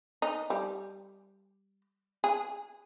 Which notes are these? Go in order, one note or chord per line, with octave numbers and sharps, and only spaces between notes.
D#4
G3
G#4